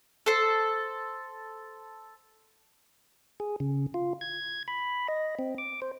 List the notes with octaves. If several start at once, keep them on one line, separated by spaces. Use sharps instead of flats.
A4 C5
G#4
C#3
F4
G#6
B5
D#5
C4
D6
C5